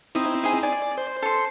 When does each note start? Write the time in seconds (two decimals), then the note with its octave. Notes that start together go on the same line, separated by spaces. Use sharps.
0.15 C4 D#4 E4 D#6
0.43 G#4 D#5
0.63 D5 G#5
0.98 C5
1.22 A4 C6